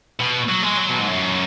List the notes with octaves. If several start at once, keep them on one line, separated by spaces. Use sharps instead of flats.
B2
F#3
G#3
F#3
B2
G#2
F#2